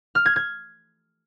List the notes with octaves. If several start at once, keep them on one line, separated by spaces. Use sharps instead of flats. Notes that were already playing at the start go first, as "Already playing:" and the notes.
F6
G#6
G#6